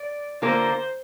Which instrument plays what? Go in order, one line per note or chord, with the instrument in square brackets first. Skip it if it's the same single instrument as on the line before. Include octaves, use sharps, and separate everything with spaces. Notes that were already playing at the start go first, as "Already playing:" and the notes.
Already playing: [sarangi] D5
[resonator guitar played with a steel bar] D3 A#3 F4 A#4 [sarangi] C5